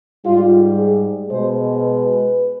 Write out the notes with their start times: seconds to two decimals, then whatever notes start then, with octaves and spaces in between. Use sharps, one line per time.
0.25 G#2 G3 F4
0.77 G#4
1.29 B2 G#3 C5
1.81 B4